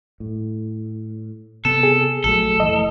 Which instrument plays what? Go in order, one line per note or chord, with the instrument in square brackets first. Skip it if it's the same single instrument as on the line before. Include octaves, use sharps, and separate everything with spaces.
[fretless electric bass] A2
[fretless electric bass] C3 B3 [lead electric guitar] A4
[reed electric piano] G#4
[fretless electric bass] A#1 F#3 A3 [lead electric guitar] A4
[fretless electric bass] F1 E3 A3 [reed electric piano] D#5